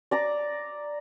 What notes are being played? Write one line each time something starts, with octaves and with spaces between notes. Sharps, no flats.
D5 A#5 D6